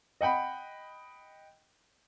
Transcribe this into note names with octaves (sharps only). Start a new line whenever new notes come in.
D#5 F#5 G5 B5